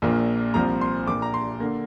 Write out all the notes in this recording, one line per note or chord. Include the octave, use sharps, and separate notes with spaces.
A#1 A#2 F3 A#3
C2 A#2 F3 C4 A#5
C6
A#1 A#2 A#3 D6
A#5
C6
D3 A#3